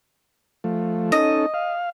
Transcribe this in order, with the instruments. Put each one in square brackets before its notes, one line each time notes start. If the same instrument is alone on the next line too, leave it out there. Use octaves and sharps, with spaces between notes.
[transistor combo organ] F3 A3
[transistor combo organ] C#4 D#4 A4 [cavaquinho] D#5
[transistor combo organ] F5